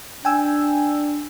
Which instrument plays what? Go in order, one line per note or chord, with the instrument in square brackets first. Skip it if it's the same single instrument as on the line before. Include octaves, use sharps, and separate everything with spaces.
[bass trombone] D4 [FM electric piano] G5 G#5 E6